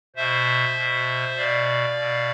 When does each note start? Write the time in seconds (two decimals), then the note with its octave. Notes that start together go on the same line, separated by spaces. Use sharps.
0.16 B2 C5 E5
0.76 B2
1.37 B2 D5 F5
1.98 B2